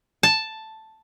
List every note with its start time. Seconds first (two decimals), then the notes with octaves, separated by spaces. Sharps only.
0.23 A5